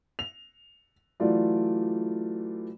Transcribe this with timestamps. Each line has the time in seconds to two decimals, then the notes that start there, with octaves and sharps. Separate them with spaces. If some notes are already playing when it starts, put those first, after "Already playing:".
0.19 F7
1.20 E3 F#3 A3 F4 D5